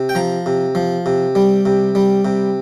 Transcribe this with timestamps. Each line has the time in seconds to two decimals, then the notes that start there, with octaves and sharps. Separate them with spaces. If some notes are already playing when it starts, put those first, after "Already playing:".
Already playing: C3
0.09 G5
0.15 F3 A#5
0.46 C3
0.75 F3
1.06 C3
1.35 G3
1.66 C3
1.95 G3
2.25 C3